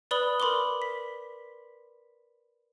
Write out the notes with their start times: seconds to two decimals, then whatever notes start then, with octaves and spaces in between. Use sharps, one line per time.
0.11 B4 D5 B5 D#6 G7
0.40 A#4 B5 C6 D6 G7
0.82 B6